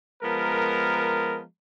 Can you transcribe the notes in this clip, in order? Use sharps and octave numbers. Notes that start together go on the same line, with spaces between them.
F3 G#3 B3 A#4